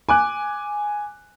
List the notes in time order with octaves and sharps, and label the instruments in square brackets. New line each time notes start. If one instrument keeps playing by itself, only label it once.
[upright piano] G#5 D6 F#6